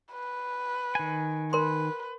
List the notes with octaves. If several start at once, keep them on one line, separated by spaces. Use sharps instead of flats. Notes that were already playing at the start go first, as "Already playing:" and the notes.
B4
D#3 G#5
A#4 B4 C6